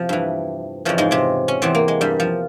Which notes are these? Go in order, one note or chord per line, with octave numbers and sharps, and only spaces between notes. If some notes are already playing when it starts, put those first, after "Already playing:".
Already playing: E2 C3 F3 C4
G2 E3
F2 C#3 E3 F3
G#2 G#3
C3 C4
C#4
E2 C3 E3 C4
A#3
G#3
G2 G3
F3